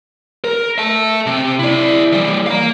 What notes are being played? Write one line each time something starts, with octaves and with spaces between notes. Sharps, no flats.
A#4
E5 A5
C3
E4 D5
E3 G3
F5 A#5